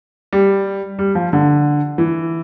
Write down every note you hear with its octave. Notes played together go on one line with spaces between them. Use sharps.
G3
G3
F3
D3
E3